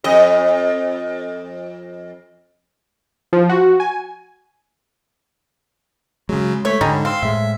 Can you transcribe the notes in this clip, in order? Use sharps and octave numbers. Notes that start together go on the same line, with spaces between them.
F2 D#5
F3
F#4
G#5
C#3 F#3 G#3
A3 C#5 B6
G#2 D3 G3 C#4 D#4
C4 F5 C6 E6
A2 G#3 E5